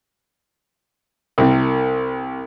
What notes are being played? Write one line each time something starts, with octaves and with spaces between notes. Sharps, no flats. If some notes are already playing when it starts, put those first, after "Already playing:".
C2 C3